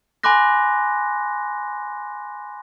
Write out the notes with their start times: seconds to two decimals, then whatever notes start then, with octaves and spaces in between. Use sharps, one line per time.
0.23 G#5 B5 C6 D6 F#6 A#6